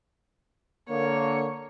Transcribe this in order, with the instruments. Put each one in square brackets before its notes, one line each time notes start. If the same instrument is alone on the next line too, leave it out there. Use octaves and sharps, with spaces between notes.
[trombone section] D3 A#3 [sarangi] C#5